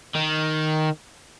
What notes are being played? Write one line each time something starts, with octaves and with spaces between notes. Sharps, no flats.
D#3